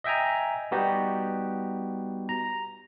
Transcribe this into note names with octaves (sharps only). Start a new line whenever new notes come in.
D#5 E5 G5 G#5 A#5
G3 B3 D#4 F#4 G4
A#5